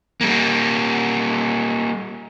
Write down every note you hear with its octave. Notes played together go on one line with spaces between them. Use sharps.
G3 A#3